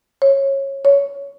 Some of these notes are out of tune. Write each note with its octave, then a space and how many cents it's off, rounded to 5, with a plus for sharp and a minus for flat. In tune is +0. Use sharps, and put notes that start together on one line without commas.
C#5 -20
C#5 +15